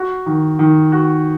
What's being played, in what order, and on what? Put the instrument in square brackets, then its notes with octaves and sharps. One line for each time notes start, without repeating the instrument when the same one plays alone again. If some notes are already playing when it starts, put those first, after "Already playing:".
Already playing: [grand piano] F#4
D#3
D#3
F#4